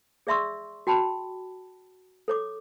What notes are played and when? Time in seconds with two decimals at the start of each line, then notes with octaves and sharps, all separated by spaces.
0.27 G#4 D5 E5 C6 C#6 E6
0.87 F#4 G5 A5 B5
2.28 A4 C#5 D6